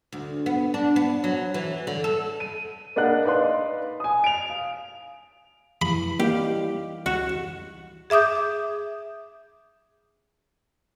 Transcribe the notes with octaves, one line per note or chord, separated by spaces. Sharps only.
D2
B3
D4
B3
F#3
E3
D3
A4
D#7
A#3 D4 D#5 F#5 F#6
D#4 B4 D5 F5 C6
G#5 D#6
D7 F7
F5
E3 B5
G3 A#3 D#4 G4 F5
C#2 F#4 E7
G#4 E5 D6 D#6 G6